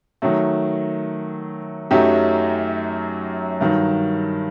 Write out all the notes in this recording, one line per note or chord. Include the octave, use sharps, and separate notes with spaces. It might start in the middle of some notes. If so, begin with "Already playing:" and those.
D#3 F#3 A3
F#2 F#3 A3 D#4 G4
G2 D#3 F#3